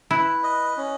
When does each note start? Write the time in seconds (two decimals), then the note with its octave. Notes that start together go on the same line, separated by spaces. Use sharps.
0.11 E4 B4
0.43 D#5
0.77 C#4